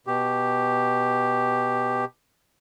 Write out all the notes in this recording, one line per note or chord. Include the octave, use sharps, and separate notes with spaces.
B2 G4